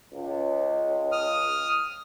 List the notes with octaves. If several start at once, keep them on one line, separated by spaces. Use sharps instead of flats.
C#2
D#6 F6